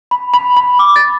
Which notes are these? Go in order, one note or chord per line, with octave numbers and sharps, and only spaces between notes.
B5
B5
B5
D6
A6